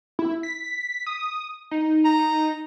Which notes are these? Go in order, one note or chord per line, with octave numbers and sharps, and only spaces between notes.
E4
B6
D#6
D#4
A#5